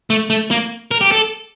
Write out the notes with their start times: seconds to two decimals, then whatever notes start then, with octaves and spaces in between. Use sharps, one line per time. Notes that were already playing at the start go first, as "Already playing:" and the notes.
0.10 A3
0.30 A3
0.51 A#3
0.91 A#4
1.01 G4
1.12 A4